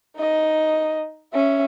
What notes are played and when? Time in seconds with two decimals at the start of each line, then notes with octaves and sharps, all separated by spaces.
0.16 D#4 D#5
1.34 C#4 E5